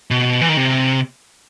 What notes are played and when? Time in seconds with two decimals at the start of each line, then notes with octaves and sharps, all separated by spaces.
0.11 B2
0.41 E3
0.49 D#3
0.57 C3